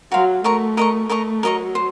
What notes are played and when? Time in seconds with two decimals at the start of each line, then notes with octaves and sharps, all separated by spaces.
0.12 F#3 F#4 A#4 F5 C6
0.44 A3 A#4 D#5 A#5 C#6
0.77 A#4 D#5 A#5 C#6
1.10 A3 A#4 D#5 A#5 C#6
1.43 F#3 A#4 D#5 A#5 C#6
1.75 C5